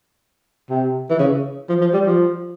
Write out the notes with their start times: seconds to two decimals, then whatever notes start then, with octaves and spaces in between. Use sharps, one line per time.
0.70 C3
1.10 E3
1.19 C#3
1.69 F3
1.81 F3
1.93 G3
2.07 F3